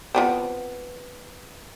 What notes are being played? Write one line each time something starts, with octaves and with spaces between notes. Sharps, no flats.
F3 B3 C4